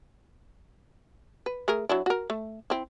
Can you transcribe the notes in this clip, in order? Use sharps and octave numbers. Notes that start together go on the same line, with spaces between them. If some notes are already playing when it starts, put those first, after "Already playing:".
B4
A3 G#4 A#4
F#3 D4 E4
F#4 A#4
A3
C4 E4